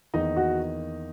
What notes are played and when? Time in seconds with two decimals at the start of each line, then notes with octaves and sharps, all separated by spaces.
0.14 E2 D#3 A#3 D#4 D#5
0.36 F#4 F#5